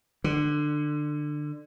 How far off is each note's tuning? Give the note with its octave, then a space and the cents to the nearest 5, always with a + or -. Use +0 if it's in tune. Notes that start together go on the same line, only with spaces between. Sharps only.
D3 +20